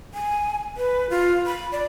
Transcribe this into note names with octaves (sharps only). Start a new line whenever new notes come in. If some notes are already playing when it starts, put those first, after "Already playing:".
G#5
B4
F4
B5
D5